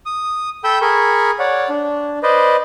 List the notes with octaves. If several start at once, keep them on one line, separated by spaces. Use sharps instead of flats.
D#6
A4 G5 B5 E6 G6
G#4 A#4 B5 C#6
C#5 D5 F#5
D4
B4 C5 D5 D#5